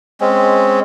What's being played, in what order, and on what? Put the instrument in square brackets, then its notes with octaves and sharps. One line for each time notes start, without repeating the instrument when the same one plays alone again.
[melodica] G#3 C4 C#4